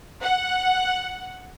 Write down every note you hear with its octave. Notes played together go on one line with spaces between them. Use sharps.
F#5